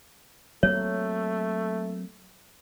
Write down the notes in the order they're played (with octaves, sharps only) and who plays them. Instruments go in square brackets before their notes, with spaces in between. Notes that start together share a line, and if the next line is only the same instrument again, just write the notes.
[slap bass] F#3 A#3 C4 [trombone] A3 [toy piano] C#5